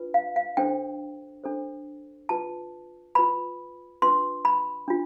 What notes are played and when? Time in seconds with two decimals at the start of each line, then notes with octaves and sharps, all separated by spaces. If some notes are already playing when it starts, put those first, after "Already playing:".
Already playing: D4 F4 B4
0.14 F5
0.36 F5
0.57 D4 A4 C5 G5
1.44 D4 A4 C5
2.29 F4 B4 A5
3.15 F4 B4 B5
4.02 D4 F4 B4 C6
4.45 B5
4.88 D4 F4